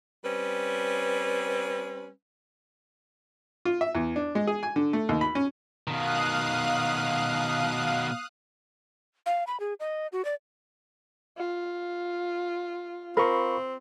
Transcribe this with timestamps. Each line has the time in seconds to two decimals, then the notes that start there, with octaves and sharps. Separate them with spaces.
0.25 G3 C4 C#4 B4
3.65 F4
3.81 E5
3.95 E2
4.16 D4
4.35 G#3
4.47 G#4
4.63 G#5
4.76 D3
4.93 A3
5.09 D#2
5.21 B5
5.35 C#4
5.88 B2 D#3 F5 D#6 F#6
9.26 F5
9.47 B5
9.60 G#4
9.80 D#5
10.12 F#4
10.25 D5
11.37 F4
13.17 C4 F4 A#4 B5 C#6